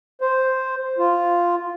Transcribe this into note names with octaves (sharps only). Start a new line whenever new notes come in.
C5
F4